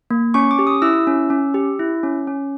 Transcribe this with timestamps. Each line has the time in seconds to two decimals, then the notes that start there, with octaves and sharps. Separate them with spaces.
0.10 A#3
0.34 C#4 C#6
0.51 D6
0.59 G4
0.67 D#6
0.82 E4 E6
1.07 C#4
1.30 C#4
1.54 G4
1.79 E4
2.03 C#4
2.27 C#4